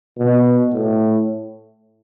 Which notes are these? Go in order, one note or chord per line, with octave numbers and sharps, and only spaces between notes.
B2
A2